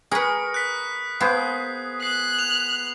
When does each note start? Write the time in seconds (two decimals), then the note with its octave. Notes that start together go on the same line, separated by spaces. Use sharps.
0.11 G#4 A#4 B4 B5 C#6 D#6
0.54 F#6 B6
1.21 A#3 B3 G#4 C5 C7
2.03 F#6 C7
2.39 F7